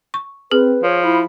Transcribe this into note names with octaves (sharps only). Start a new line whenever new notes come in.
C#6
C4 G#4 B4
F3 C#5
E4 B5